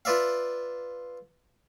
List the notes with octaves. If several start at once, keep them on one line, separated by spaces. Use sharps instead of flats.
F4 B4 D5 E5 F5